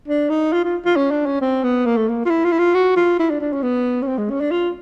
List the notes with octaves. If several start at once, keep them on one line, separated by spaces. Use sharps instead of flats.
D4
D#4
F4
F4
F4
C#4
D4
C#4
C4
B3
A#3
A3
A#3
F4
E4
F4
E4
F4
F#4
F4
E4
D4
D4
C#4
B3
C#4
C4
G#3
C#4
D4
F4